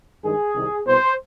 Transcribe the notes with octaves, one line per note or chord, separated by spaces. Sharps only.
G2 D#3 G#3 G#4
C2 C3 D#3
C2 B2 B3 C5